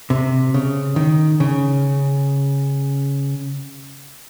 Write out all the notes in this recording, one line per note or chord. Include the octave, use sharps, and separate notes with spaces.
C3
C#3
D#3
C#3